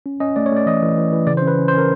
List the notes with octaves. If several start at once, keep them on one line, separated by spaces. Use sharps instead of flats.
C#4
C#4 D#5
A3 D5
C#5
A3 D5
E3 D#5
E3
E3
E3
C#3 D5
C5
C#4
B4
C#4
C5
C#4 A#4